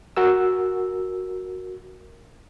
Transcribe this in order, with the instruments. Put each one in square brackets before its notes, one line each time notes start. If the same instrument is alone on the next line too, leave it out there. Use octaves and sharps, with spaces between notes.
[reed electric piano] F#4 A#4 E6